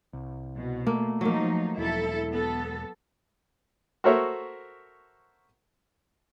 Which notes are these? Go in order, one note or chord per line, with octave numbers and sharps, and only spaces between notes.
C2
B2
A3 A#3
F3 F#3 A#3 D#4
E1 E4 A4
B3 A4
F#4 A4 A#4 C5 C#5 E5